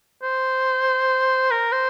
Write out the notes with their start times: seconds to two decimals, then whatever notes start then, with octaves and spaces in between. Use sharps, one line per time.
0.23 C5
1.51 A#4
1.72 C5